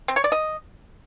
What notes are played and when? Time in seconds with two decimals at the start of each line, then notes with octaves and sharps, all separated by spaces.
0.08 C4
0.16 C#5
0.24 D5
0.32 D#5